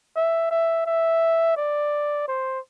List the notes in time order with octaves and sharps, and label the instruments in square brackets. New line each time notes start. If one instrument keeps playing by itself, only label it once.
[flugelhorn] E5
E5
E5
D5
C5